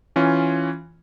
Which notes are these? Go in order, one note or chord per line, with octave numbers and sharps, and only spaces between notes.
E3 C#4 F4